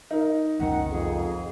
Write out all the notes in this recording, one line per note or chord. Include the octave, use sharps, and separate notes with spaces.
D#4 A#4
F#1 C#2 D#3 C4 F#5
F2 G#4